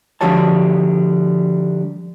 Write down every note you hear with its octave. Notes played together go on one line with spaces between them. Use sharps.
D3 F3 G3 F#4 C#5 A5